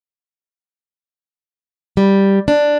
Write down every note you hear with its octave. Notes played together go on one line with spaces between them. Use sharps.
G3
D4